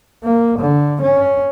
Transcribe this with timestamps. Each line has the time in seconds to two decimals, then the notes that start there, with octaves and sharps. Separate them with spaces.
0.24 A#3
0.59 D3
1.02 C#4